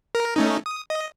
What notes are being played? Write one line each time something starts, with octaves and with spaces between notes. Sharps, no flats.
A#4
A3 C#4 D#4
D#6
D#5